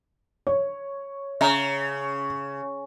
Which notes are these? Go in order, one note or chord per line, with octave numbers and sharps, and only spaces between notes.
C#5
C#3 E5 A#5